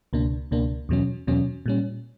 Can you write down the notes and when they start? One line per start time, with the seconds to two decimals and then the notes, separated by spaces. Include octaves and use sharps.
0.13 C#2 B2 A#3 D4
0.51 C#2 B2 A#3 D4
0.89 E2 B2 F#3 C#4
1.27 E2 B2 F#3 C#4
1.66 A#2 G3 C#4